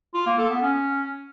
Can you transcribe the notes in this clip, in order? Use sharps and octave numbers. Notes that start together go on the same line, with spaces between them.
F4
A#3
A4
B3
C#4